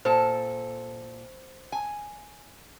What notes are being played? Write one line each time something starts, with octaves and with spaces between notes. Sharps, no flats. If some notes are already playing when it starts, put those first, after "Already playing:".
A#2 A4 C5
G#5